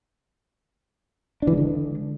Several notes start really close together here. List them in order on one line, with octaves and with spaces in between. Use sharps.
D4 E3 G#3 D3